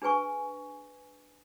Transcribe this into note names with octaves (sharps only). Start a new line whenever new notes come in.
D4 G#4 B4 G#5 C#6